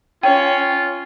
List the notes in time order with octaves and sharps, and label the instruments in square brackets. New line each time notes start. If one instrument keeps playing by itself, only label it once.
[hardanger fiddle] C#4 C#5 [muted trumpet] F4 [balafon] G5